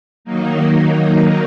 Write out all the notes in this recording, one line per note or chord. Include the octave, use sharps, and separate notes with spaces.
D#3 F#3 A#3 D#4